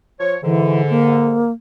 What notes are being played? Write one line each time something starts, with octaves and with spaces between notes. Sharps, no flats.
F3 C#5
G#2 D3 E3
A#3